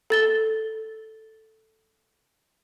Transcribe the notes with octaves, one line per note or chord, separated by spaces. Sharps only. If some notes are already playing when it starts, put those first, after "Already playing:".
A4 A6 G7